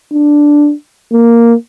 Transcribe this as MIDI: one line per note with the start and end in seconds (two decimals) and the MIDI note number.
0.13 0.73 62
1.12 1.54 58